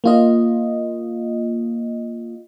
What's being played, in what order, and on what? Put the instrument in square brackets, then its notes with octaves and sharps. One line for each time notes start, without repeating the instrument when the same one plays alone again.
[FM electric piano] A#3 F4 D#5